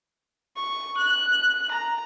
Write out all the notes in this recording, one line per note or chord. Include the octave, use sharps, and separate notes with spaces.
C#6
F#6
A#5